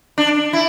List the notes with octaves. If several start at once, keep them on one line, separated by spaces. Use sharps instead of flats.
D4
E4